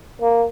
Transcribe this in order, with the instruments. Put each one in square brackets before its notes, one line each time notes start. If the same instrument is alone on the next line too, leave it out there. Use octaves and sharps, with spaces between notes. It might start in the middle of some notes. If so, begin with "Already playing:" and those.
[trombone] A#3